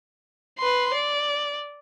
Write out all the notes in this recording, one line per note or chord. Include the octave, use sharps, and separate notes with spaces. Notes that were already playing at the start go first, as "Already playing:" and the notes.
B4 C6
D5